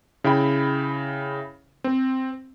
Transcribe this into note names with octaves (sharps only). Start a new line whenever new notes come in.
C#3 E4 G5 B5
C4